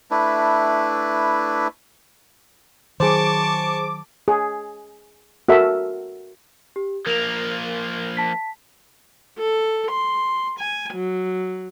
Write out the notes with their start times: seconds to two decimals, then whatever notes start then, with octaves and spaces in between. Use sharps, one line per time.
0.11 A3 D4 E4 B4
3.00 D#3 F#3 G#4 C5 A5 C#6 D6
4.28 G#4
5.48 F#4 A4 A#4 E5
6.76 G4
7.06 F3 A#3 A#4 F7
8.17 A5 B6
9.39 A4
9.91 C6
10.59 G#5
10.94 F#3